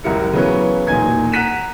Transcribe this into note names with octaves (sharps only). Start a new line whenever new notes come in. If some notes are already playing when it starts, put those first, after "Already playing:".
F#1 C#2 G3 E4 A#4 C#7
C#3 E3 F#3 B3 C#4
E1 A#2 D#4 G#5 G#6
F#5 A#5 F#6 B6 D#7 E7